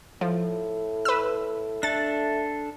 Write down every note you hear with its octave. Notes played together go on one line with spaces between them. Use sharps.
A2 F3
B4 E6
A3 D4 A4 A6